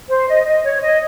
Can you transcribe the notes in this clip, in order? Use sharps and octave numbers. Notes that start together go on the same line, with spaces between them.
C5
D#5
D#5
C#5
D#5